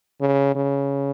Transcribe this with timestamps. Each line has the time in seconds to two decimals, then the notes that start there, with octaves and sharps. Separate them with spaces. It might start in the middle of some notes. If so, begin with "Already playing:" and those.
0.21 C#3
0.55 C#3